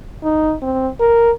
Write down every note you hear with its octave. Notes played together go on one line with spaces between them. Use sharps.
D#4
C4
A#4